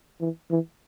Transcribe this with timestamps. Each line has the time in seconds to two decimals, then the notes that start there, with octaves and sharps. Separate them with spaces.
0.21 E3
0.50 E3